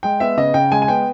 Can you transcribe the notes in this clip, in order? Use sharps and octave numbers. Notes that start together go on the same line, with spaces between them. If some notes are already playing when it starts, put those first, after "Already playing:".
G#3 G5
B3 E5
C#3 D#5
C#3 G5
G#3 G#5
G#5
B3 G5